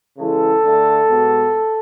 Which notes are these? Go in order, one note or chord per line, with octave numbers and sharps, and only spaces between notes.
C#3 E3 G#3 A4
D3 A3
B2 G#3 B3